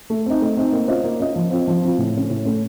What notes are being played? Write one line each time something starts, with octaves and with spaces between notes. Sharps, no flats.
A3
C4 D#4
A3
C4 D#4
A#3
C#4 F4 C5 D#5
A#3
C#4 F4 C5 D#5
F3
C4 F4
F3
C4 F4
A2
A3 C#4
A2
A3 C#4